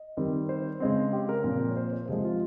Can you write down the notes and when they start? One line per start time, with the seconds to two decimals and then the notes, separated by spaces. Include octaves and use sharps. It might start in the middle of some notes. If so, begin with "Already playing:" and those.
Already playing: D#5
0.17 D#3 G3 C4
0.49 C5
0.80 C#3 G#3 C4
1.13 G4
1.29 A#4
1.44 A#2 F3 C4
1.69 C#5
1.77 C5
1.93 C5
2.08 C3 F3 G#3 G#4
2.25 F4